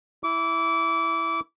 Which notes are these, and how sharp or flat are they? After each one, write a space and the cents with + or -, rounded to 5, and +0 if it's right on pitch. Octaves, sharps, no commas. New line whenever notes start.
E4 +0 D6 -30